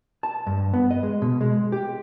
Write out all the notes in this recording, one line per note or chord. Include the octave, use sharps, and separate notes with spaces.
A5
G2
B3
D#5
G#3
B2
G#3
G4